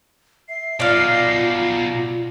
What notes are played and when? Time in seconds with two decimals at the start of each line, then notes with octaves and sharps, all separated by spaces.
0.49 E5 C7
0.80 B2 D#4 F4 D5 F5